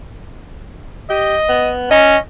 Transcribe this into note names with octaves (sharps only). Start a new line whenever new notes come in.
G4 D#5
B3
C#4 D#5